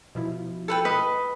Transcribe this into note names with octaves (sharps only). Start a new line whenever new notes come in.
B2 F3 E4
A4 B4 G5
B4 D#5